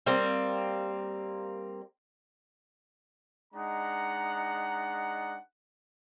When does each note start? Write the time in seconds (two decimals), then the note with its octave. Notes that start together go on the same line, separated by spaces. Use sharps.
0.06 G3 A#3 C4
3.53 G#3 D4 D#4 F#5 A#5